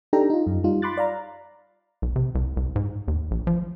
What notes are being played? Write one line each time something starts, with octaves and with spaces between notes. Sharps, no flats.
D4 D#4 G4 A4 G5 A#5
D#4 F4
F#2
G3 D#4 F4
B5 C6 D6 F#6 A6
D5 F5 A#5
B1
C3
C2
C2
G#2
D#2
A#1
F3